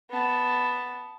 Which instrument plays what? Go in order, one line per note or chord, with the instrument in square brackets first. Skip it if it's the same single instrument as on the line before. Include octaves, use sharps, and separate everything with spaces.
[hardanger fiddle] B3 A5